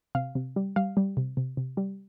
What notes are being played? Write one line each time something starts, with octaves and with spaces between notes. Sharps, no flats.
C3 F5
C3
G3
G3 F5
G3
C3
C3
C3
G3